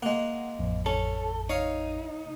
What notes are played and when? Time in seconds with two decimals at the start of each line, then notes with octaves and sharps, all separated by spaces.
0.02 G#3 A#3 F#5
0.59 A1 F2
0.86 C#4 A4
1.49 D#4 C#5 F5